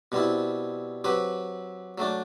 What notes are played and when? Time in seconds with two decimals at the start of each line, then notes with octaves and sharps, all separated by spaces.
0.12 B2 G3 C4 E4
1.04 F#3 C4 G4 B4
1.98 F#3 A3 D4